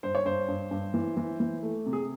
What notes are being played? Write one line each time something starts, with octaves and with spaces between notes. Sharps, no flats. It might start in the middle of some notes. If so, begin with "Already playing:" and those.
G2 C5
C#5
G2 C5
G2
G2
E3
E3
E3
A3
C3
G#4